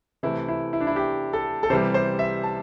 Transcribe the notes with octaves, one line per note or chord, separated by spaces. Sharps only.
C3 E3 A3 E4
E4
E4
D4
E4
G4
A4
A4
C3 E3 G3 C5
C5
E5
A5